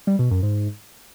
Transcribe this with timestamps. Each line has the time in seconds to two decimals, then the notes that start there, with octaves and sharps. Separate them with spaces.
0.07 G3
0.19 B2
0.31 F#2
0.43 G#2